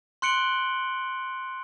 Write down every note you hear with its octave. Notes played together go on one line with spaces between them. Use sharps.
C6 F#6 C#7 D7 F#7 G7